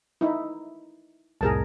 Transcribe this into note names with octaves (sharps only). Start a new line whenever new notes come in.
D#4 E4
C2 F2 A2 G#4 A#4 A5